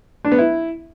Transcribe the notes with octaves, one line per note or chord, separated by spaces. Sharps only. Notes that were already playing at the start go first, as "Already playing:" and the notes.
D4
B3
E4